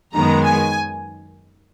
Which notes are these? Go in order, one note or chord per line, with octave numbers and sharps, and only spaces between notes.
F#2 D#3 G#3 B3 A#5
G#5